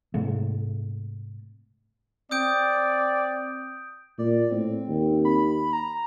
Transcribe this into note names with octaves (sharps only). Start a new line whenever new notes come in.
G#2 C3 G#3 A3
C4 D5 D#6 G6 D7
A#2 D5
A2 C4
D#2
B5
A#5